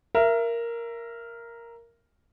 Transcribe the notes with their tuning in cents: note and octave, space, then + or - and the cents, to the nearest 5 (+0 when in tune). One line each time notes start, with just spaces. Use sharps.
A#4 +0 E5 +30